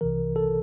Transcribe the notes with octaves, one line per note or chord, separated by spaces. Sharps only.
C2 C3 E3 A#4
A4